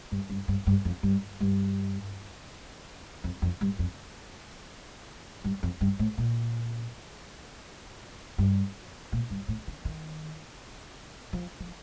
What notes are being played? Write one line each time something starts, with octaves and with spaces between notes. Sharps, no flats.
G2
G2
G2
G2
F2
G2
G2
F2
F2
G2
F2
G2
F2
G2
A2
A#2
G2
A#2
G2
A2
D3
D#3
F3
F3